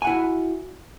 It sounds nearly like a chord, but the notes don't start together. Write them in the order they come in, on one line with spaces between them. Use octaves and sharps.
G#5 F#5 E4 F#4